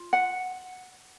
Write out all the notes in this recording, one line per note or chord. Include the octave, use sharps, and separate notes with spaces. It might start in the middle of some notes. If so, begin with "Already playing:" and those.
Already playing: F4
F#5